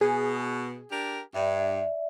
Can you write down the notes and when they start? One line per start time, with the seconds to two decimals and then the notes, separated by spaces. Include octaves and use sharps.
0.01 B2 G#4
0.91 D4 G4 A#4
1.34 G2 D5 E5